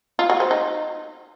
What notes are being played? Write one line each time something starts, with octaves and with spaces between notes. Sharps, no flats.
F4
F#4
C5
D#4